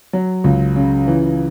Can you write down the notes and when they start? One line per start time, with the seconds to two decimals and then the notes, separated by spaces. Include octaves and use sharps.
0.13 F#3
0.44 C#2
0.76 C#3
1.07 E3